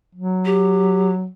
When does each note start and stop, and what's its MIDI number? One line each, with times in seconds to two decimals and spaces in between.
0.15 1.28 54
0.45 1.10 67